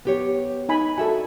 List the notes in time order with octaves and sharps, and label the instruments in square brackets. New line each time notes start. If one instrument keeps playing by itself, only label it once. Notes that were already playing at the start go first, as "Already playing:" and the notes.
[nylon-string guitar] B3 G4 C#5
[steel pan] D#4 G#5 B5
[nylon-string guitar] F#4 E5 [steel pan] A4 G#5